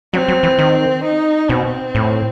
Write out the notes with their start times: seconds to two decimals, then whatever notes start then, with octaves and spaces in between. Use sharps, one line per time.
0.13 F#3 C4
0.28 F#3
0.43 E3
0.59 D#3
1.04 D#4
1.49 B2 C4
1.95 A2